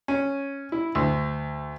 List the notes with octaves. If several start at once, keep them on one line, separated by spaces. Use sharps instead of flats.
C#4
E4
D2